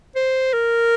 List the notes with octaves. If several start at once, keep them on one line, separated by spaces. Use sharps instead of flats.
C5
A#4